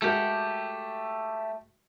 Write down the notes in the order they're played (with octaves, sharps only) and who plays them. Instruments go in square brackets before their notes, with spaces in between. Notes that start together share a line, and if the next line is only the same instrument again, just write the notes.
[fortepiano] G#3 F#4 A#4 [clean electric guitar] A3 G4